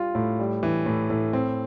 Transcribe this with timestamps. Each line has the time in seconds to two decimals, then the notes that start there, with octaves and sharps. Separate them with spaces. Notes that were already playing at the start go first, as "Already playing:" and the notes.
Already playing: G3 F4
0.15 A2
0.39 G3
0.63 E3
0.86 A2
1.10 A2
1.33 C4